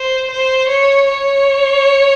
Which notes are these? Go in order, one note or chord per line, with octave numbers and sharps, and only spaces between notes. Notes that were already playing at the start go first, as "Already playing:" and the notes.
Already playing: C5
C5
C#5
C#5